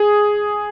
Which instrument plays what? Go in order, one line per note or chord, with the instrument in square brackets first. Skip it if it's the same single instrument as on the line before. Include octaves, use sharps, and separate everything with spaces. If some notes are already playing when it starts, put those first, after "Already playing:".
Already playing: [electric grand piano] G#4